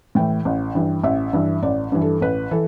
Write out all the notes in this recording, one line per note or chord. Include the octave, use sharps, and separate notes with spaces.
A2 E3 G5
A1
G2 E3
A1 E5
G2 E3
A1 D5
G2 E3
A4
A1 B4
E3 A4